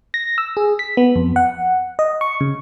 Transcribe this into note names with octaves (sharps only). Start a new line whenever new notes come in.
A#6
E6
G#4
B6
B3
F2
F#5
D#5
C#6
C#3